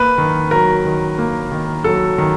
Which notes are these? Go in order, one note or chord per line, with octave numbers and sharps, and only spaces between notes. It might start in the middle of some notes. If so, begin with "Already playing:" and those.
Already playing: A#3 B4
D#3
F#3 A#4
D#3
A#3
D#3
F#3 A4
D#3